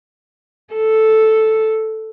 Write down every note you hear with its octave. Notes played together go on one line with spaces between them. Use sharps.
A4